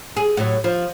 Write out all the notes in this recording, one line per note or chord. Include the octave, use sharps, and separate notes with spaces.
G#4
A2 F#3
F3